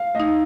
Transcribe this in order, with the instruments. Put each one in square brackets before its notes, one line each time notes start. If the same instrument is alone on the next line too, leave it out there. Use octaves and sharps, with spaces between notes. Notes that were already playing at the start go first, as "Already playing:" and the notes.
Already playing: [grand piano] F5
[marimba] A3 D#4 [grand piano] D#5